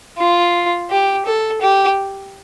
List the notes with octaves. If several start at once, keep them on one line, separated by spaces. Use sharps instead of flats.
F4
G4
A4
G4